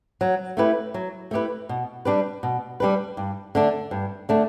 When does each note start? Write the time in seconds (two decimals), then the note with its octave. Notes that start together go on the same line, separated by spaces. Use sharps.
0.21 F#3
0.57 A3 E4 G4 B4
0.94 F#3
1.31 A3 E4 G4 B4
1.69 B2
2.05 G3 D4 G4 B4
2.43 B2
2.80 G3 D4 G4 B4
3.17 G2
3.55 D3 A3 D4
3.91 G2
4.29 D3 A3 D4